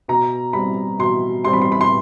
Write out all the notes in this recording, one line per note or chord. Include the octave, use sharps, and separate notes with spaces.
B2 A#5
G3 C4 B5
B2 C6
G3 C4 C6
B5
C6
B5
C6